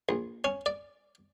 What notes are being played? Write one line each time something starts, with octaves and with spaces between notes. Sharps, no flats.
A#1
C#4
D5